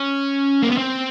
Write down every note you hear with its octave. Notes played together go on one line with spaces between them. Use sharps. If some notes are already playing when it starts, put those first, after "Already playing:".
Already playing: C#4
A#3
B3
C4